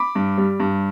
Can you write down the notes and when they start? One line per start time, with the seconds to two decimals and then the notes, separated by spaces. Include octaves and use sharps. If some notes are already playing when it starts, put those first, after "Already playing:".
Already playing: B5 D6
0.15 G2
0.38 G3
0.60 G2